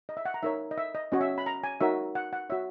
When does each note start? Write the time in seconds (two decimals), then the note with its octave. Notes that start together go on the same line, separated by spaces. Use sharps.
0.09 D#5
0.17 E5
0.25 F#5
0.34 A#5
0.43 D#4 A#4 C#5 E5
0.71 D#5
0.78 E5
0.95 D#5
1.12 C#4 F#4 C#5 D#5
1.21 E5
1.38 B5
1.46 A#5
1.64 G#5
1.81 D#4 F#4 A#4 C#5 E5
2.15 F#5
2.33 F#5
2.50 F#4 C#5 E5